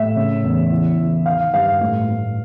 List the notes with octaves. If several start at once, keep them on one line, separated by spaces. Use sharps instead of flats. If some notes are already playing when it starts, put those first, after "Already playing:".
Already playing: A2 E5
C#3
E2
E3
E3
D#3 F5
G2 F5
A2
A2